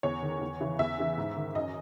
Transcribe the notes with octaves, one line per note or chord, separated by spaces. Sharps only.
E2 C#5
D#3
E2
C#3 E3
E2 E5
C#3 E3
G#2
D#3
F#2 D#5